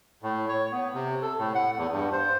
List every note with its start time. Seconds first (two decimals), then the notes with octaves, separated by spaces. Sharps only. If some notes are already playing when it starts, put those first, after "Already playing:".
0.22 A2
0.49 C#5
0.72 B3
0.94 C3
1.22 A4
1.39 A2
1.55 F#5
1.78 E2
1.92 G2
2.13 C5